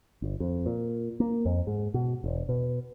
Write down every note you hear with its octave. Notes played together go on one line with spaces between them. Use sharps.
G1
F2
A#2
A#3
F2
G#2
B2
E1
B2